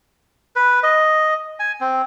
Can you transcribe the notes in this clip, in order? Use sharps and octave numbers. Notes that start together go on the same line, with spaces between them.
B4
D#5
G#5
C4